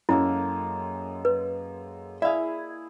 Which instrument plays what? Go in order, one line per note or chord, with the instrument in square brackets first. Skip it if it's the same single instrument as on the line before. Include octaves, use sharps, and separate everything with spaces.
[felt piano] F#2 [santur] G#3 A#3 A4 [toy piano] E4
[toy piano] B4
[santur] E4 G#4 [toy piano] D5 [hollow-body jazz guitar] E5 F5